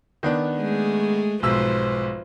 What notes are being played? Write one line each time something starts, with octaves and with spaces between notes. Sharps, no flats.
D#3 B3 D4
G#3 A3 G#4
B1 G#2 F3 B4 C5 E6